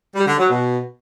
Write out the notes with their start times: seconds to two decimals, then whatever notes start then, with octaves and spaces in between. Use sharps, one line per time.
0.16 G3
0.27 D3
0.38 F#3
0.50 B2